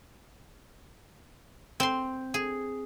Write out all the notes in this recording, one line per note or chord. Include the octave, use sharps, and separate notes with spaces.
C4 C6
G#4